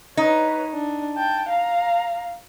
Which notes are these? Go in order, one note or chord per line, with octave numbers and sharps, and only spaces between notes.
D#4 B4 C#5
D4
G5 A5
F5 A#5